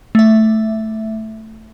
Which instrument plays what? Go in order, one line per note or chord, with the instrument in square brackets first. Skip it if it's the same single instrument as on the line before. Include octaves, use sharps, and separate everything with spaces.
[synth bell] A3 E5